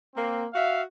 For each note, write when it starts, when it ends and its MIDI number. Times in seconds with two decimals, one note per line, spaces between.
0.16 0.44 58
0.16 0.44 60
0.53 0.81 66
0.53 0.81 76
0.53 0.81 77